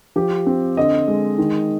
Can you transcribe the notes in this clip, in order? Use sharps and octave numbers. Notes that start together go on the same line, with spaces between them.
F3 G4
C4
D3 D#5
G#3
D#3